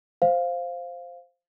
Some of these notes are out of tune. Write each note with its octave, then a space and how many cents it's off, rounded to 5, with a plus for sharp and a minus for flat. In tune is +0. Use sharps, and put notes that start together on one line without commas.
C5 +0 F5 +0